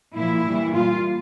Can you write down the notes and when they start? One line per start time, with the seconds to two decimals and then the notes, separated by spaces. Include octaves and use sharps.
0.16 A#2 F3 A#3 E4
0.45 G2 E3 G3 A#3
0.74 A#2 G3 A#3 F4